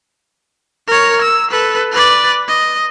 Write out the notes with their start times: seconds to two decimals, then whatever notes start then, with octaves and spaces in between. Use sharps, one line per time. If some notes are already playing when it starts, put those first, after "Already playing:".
0.87 A#4 C#5
1.22 E6
1.51 A4 B4
1.92 B4 D5
2.48 D#5